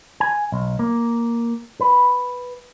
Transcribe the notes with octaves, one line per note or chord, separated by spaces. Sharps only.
G#5
B1
A#3
B4